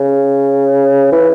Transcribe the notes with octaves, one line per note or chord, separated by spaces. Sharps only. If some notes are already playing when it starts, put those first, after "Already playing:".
Already playing: C#3
E3